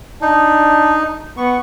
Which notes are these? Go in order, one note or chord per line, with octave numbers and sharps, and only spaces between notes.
D4 D#4
B3 C#6